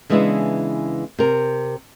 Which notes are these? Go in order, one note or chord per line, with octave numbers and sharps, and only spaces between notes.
C#3 E3 G#3 B3 D4 E4
C3 A#4